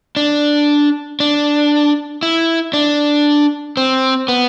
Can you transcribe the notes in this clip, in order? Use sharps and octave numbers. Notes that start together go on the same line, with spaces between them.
D4
D4
E4
D4
C4
B3